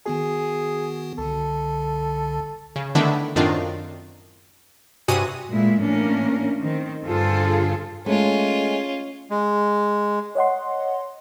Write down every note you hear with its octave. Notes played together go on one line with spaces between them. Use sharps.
D#3 B3 F#4 G#4
C2 D3 A4
C#3
D3 D#3 A3 B3 D4 E4
F#2 A2 D#3 C4 D4 F4
G2 C3 F#4 G#5 D#6 D#7
A#2 G#3 A3 E4
A2 E3 A#3 C#4 D4 A#4
D#3 C4
G2 D3 F4 G#4 A4 C5
G#3 A3 C#4 F4
G#3
C#5 D#5 F#5 C6